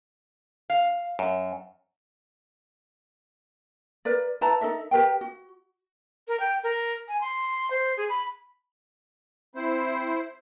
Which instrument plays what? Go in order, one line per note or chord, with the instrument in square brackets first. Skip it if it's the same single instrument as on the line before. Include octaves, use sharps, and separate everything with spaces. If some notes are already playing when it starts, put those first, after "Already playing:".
[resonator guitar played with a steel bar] F5
[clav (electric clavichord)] F#2
[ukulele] A#4 B4 D5
E4 B4 A5 A#5
D#4 A4 A#4 E5
G4 A#4 B4 G5
F#4
[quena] A#4
G5
A#4
G#5
C6
C5
G#4
B5
[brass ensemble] C4 [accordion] E4 C5